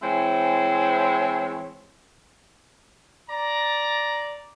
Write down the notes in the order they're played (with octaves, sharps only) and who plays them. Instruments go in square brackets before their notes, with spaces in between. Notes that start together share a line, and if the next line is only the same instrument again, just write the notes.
[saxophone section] E3 G#3 C4 E4 C5 C#5
[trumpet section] D5 A#5